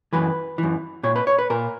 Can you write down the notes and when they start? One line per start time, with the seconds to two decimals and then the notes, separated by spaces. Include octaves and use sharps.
0.13 F#2 E3 B4
0.58 F#2 E3
1.03 A#2 C#5
1.16 B4
1.27 C#5
1.39 B4
1.50 A#2 A#4